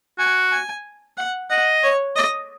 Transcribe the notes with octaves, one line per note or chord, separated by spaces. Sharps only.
F#4 G#5
G#5
F#5
D#5 F#5
C#5
D#5